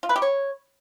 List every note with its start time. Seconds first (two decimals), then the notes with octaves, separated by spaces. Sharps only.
0.03 F4
0.09 B4
0.16 G4
0.22 C#5